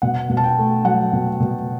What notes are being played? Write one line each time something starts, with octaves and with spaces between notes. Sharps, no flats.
B2 F#5
B2
A5
G5
A3
F#3 F#5
B2
B2